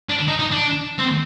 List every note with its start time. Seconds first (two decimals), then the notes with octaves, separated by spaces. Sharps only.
0.09 D4
0.28 D#4
0.39 D#4
0.51 D4
0.99 C4